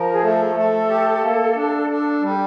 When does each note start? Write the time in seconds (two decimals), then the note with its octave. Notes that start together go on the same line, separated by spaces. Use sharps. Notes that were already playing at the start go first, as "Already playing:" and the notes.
Already playing: F3 A#4
0.13 G#4
0.23 A3 A4
0.56 A3
0.90 G4
1.22 A#3
1.56 D4
1.89 D4
2.22 G3 G4